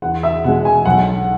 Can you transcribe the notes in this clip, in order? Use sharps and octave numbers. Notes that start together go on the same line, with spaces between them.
E2 F#5
E5
B2 G#3 F#5
G#5
B1 F#5